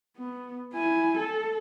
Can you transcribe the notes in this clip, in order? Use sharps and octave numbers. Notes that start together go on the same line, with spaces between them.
B3
E4 G#5
A4